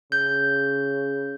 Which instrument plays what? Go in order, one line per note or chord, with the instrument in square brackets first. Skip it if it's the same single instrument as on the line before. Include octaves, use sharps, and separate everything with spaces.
[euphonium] C#3 [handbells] G6